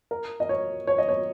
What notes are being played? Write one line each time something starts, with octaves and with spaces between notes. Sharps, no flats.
A#4
D#5
C#5
C#5
D#5
C#5